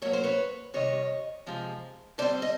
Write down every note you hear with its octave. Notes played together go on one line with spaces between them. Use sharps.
A2 F#3 A#3 C#5
C5
B4 C#5
C3 D#3 G3 C#5 D#5
C3 F3 G#3
D3 G3 C4 C5 D5
D#5